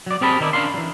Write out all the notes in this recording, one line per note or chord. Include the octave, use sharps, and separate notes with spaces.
F#3 D5
C4 G4 G#4 A#4 A5 B5
D#3 D#4 E4 C#5 D5
C#4 D4 A#4 F5 C6
E3 F#3